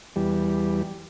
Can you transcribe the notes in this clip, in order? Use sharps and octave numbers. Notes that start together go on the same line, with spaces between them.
E2 G3